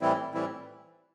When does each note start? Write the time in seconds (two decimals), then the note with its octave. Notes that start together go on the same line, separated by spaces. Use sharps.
0.01 A2 E3 G3 C4 E4
0.34 A2 E3 G3 C4 E4